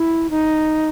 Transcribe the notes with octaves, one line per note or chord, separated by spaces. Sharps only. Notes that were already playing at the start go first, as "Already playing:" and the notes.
Already playing: E4
D#4